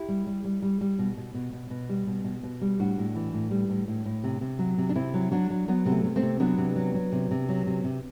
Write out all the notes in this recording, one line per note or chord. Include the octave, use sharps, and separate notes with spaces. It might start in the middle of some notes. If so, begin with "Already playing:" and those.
Already playing: E4 G4
G3
G3
G3
G3
G3
B2
B2
B2
B2
B2
G3
B2
B2
B2
G3
A2 D4 F#4
A2
E3
A2
G3
A2
A2
A2
C3
C3
F#3
C3
D4
C3 C4 E4
F#3
F#3 D4 F#4
F#3
F#3 B3
C3 B3
A3
C3
A3 C4
C3
F#3 B3 D4
C3
F#3
F#3
C3
C3
F#3
C3
C3